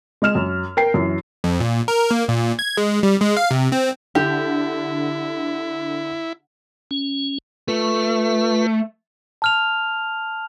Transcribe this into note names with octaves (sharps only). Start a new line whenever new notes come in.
G#3 D#5 F6 E7
F#2
A#4 G5 C7
F#2 E3
F2
A#2
A#4
A#3
A#2
G#6
G#3
G3
G#3
F5
C3
C4
D3 E4 G4
C#4
A3 F4 B4
A5 F6 F7